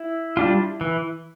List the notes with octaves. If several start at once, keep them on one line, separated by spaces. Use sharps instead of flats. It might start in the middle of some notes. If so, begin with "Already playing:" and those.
Already playing: E4 E5
G3 D4 F4
E3